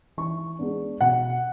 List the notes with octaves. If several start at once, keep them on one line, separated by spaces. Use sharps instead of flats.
E3 C#6
G#3 B3 D4
B2 F#5